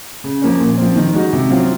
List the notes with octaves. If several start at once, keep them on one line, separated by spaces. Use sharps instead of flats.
C#3
F3 A#3 C#4
A#2
F3 C4
D#3
G#3 D#4 F#4
C3
F#3 C4 F4